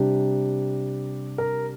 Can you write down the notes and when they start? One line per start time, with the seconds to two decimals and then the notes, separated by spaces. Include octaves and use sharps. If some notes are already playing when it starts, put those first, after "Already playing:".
Already playing: C3 G3 D4 G4
1.38 A#4